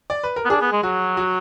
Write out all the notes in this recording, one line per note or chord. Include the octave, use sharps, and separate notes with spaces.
D5
B4
A#4
B3
D4 G#4
B3
G#3
F#3 F#4
F#4